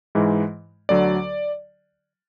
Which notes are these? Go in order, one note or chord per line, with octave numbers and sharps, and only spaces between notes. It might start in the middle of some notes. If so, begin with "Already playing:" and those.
G#2 E3 G#3
D2 D3 F#3 D5